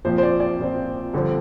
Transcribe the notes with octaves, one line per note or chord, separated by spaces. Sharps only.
A#1 A#2 F3 C4 C5
C5
D5
D5
A#1 A#2 F3 C4
G2 D3 F3 C4